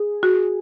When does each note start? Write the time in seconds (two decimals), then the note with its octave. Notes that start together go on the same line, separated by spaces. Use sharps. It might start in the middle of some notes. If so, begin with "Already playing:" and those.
Already playing: G#4
0.23 F#4